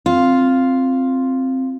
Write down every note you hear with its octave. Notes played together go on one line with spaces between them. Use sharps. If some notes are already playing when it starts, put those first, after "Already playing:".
C4 F4